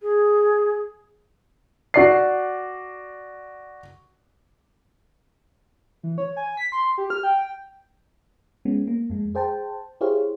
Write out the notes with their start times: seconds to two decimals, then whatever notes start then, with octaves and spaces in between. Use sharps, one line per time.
0.01 G#4
1.94 F#4 D5 C7
6.03 E3
6.18 C#5
6.37 G#5
6.57 B6
6.72 C6
6.98 G4
7.10 F6
7.23 G5
8.65 G#3 B3 C#4
8.88 A#3
9.10 F2 G#3
9.35 G#4 C5 G5 A5
10.01 E4 G4 G#4 C5 C#5 F5